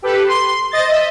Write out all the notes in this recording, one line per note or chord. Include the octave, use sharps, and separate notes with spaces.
G4 A4 B4
C6
C5 D#5 A6
D#5 E5